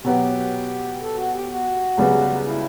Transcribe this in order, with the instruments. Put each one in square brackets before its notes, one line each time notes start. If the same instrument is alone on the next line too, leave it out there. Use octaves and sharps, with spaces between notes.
[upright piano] B2 F#3 B3 [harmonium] G4
[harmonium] A4
F#4
G4
F#4
[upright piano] C#2 C#3 G3 B3
[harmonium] E4